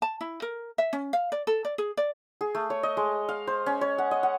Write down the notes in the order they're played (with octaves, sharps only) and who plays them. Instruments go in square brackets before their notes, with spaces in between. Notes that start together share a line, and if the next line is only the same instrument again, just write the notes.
[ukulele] A5
E4
A#4
E5
C#4
F5
D5
A4
D5
G#4
D5
[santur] G#4
A3
C#5
D#5
G#3
F5
C5
C#4
C#5
F#5
D#5
F#5